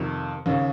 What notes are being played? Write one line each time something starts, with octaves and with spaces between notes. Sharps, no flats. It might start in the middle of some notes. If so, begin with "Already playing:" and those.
Already playing: F2 C3 D#3
D#2 C#3